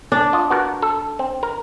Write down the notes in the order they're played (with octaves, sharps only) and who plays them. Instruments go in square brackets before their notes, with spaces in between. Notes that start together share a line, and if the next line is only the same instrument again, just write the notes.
[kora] D4
[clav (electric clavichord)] F4 D#5
B3 F#4 A#4
A4
C4
A#4